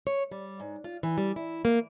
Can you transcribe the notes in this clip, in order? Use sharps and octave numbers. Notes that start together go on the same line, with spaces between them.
C#5
G3
G#2
F4
E3
G3
E4
A#3